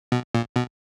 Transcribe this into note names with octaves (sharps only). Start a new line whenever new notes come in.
B2
A#2
B2